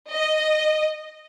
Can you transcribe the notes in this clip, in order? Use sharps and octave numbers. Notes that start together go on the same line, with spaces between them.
D#5